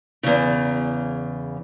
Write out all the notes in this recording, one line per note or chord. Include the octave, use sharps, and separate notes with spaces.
E2 C#3